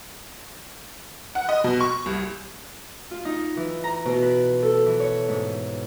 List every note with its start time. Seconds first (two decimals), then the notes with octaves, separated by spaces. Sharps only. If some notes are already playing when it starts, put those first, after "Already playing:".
1.35 F#5
1.49 D#5
1.64 B2
1.81 C#6
2.06 C2
3.11 F4
3.25 D#4
3.57 E3
3.84 A#5
4.05 B2
4.23 B4
4.62 A4
4.86 E3
5.00 C#5
5.29 G#2